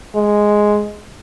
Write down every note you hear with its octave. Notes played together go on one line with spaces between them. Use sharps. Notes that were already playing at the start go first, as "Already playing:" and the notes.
G#3